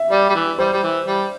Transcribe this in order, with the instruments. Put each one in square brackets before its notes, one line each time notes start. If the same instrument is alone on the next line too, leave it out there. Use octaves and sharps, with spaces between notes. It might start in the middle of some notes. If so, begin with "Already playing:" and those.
Already playing: [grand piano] E5
[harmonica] G3 [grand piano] D5
[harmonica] G3
E3
[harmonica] G3 [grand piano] C5
[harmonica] G3
E3
G3